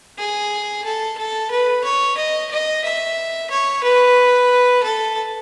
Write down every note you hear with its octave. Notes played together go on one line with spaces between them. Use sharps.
G#4
A4
A4
B4
C#5
D#5
D#5
E5
C#5
B4
A4